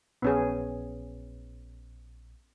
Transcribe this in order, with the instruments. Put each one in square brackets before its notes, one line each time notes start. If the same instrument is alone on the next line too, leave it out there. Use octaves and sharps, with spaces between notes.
[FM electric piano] A#1 [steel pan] B3 C#4 G#4